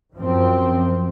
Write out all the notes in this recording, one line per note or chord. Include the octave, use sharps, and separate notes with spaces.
F#2 F3 C4